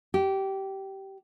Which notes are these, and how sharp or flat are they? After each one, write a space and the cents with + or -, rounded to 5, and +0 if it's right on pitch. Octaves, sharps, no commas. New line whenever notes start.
G4 -20